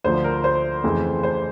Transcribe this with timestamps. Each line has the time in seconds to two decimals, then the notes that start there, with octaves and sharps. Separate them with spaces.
0.04 D2 D3 F3 C5
0.24 A#4
0.44 C5
0.84 F2 C#3 E3 A3
1.23 C5